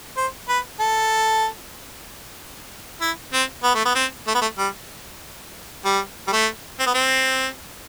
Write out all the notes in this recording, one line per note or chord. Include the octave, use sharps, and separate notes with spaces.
C5
B4
A4
E4
C4
B3
A3
B3
C4
A3
B3
A3
G3
G3
G3
A3
C4
B3
C4